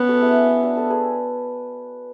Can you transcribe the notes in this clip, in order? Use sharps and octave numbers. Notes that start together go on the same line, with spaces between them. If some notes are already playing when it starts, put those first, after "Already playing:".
Already playing: B3 C#4
F#4 A4
E4 G#4
D4 F#4
F#4 A4
G#4 B4